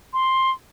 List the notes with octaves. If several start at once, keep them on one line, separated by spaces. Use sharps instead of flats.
C6